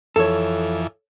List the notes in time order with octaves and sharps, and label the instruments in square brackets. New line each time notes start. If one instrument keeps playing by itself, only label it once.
[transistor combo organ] F2 E3 [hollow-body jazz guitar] A4 C#5